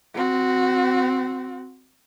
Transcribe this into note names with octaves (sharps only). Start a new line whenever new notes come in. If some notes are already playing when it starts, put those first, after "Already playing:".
C4 F#4